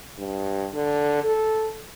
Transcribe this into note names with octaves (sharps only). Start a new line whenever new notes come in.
G2
D3
A4